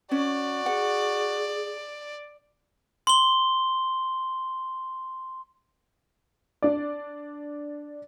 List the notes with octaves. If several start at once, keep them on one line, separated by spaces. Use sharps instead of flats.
C#4 F#4 D5
G#4 F#5
C6 G7
D4 D5